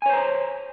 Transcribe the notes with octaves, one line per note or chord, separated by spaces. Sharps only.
C5 C#5 G#5 A#5